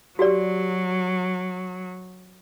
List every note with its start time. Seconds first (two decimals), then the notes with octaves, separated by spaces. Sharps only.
0.19 F#3 F#4 G4 D5